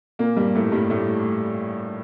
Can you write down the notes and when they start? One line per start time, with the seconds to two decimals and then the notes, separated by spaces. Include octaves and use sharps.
0.19 A#2 A#3
0.37 G2 G3
0.55 A2 A3
0.72 G2 G3
0.90 A2 A3